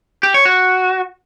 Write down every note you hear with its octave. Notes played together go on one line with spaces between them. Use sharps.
G4
C#5
F#4